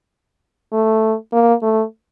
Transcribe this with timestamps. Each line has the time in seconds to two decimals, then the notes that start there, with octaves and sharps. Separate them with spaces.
0.72 A3
1.33 A#3
1.62 A3